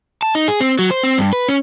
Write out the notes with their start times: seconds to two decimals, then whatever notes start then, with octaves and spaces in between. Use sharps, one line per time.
0.23 A5
0.35 D#4
0.48 G#4
0.61 C4
0.79 F#3
0.91 C5
1.03 C4
1.18 G2
1.33 B4
1.48 C#4